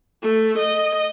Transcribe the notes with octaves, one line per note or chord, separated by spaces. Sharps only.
A3
D#5